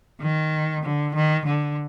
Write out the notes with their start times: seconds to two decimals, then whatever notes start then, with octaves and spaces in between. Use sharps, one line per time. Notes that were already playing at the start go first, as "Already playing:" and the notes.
0.21 D#3
0.83 D3
1.15 D#3
1.46 D3